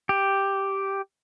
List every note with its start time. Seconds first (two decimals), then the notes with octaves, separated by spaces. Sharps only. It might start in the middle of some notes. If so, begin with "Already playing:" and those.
0.09 G4